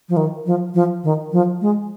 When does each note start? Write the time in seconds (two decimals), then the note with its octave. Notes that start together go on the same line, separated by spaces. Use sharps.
0.09 F3
0.17 D#3
0.46 F3
0.74 F3
1.04 D#3
1.32 F3
1.61 G#3